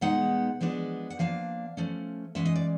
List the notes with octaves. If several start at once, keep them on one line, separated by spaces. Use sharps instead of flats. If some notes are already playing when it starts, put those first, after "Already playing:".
B2 G#3 B3 D#4 F#5
F3 G#3 B3 D4
F#5
F3 A#3 D4 F5
F3 A3 C#4
E3 G#3 C#4 E5
D#5
D5